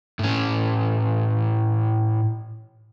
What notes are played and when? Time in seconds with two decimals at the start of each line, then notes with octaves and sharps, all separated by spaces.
0.19 A2 C#4